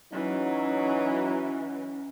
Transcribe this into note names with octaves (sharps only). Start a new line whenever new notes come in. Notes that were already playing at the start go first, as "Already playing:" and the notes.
E3 F#3 C#4 D#4